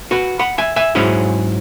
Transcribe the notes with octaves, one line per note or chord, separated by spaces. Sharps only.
F#4 B4
F#5 B5
E5 G#5
E5 G#5
G#2 F#3 C#4 E4 G#4